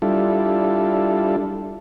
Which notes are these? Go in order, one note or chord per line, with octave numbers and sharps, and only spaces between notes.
G3 D4 E4 F4 A4